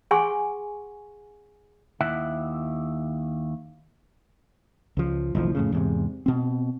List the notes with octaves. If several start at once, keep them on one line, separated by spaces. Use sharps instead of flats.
G#4 F#5 G#5 C6 C#6
D#2 E4 E5 F#5
C#2 F3
F#1 B1 E3 F3
F2 A2 C#3
E2 G#2 C3
B2 C4